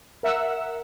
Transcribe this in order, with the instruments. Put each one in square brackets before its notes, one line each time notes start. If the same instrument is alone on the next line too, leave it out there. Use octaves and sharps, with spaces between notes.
[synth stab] A#4 E5 F#5 E6